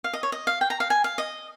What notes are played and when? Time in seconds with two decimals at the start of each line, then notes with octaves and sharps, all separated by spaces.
0.04 F5
0.13 D#5
0.23 C#5
0.32 D#5
0.47 F5
0.61 G5
0.70 A#5
0.80 F5
0.90 G#5
1.04 F5
1.18 D#5